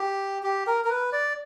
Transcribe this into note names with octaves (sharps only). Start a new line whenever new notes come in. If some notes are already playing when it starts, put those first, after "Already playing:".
Already playing: G4
G4
A#4
A#4
B4
D5